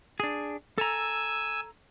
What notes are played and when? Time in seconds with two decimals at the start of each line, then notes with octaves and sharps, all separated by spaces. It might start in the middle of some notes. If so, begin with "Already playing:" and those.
0.20 D4 G#4
0.78 A4 G#5 A#5 E6